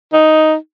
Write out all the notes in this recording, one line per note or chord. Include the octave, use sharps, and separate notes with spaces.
D#4